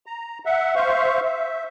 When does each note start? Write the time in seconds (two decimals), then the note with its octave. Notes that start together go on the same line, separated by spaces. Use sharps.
0.06 A#5
0.45 E5 F#5
0.76 C5 E5 F5 C#6
1.24 E5